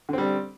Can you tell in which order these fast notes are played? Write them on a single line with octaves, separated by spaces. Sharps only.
D3 C4 G3